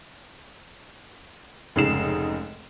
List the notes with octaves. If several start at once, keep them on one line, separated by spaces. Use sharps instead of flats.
F1 G#2 C#3 D#4 C7 E7